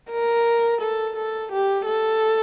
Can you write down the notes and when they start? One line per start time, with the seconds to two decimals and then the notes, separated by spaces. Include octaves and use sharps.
0.11 A#4
0.81 A4
1.16 A4
1.51 G4
1.87 A4